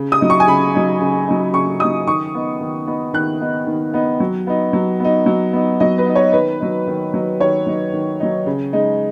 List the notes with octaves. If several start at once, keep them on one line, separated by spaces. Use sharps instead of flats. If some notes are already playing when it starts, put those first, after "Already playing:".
Already playing: C#3
D#6
F#3 D#4
C#6
G#5
C#3 B5
F#3 D#4
C#3
F#3 D#4
C#3 C#6
F#3 D#4 D#6
D#3 C#6
B3 D#4
D#3
B3 D#4
D#3 F#6
B3 D#4
D#3
B3 D#4
F#3
B3 D#4
F#3
B3 D#4
F#3
B3 D#4
F#3 D#5
B4
B3 D#4
C#5
D#3 B4
F#3 D#4
D#3
F#3 D#4
D#3 C#5
F#3 D#4
D#3
F#3 D#4
C#3
G#3 D#4